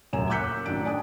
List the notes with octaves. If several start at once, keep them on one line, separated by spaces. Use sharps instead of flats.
D#1 F#2 C#5 G#5 E7
D6 E6 F#6 G6 B6 C#7
A1 D#3 F#3 D4 D7
D5 G#5 A5 D#6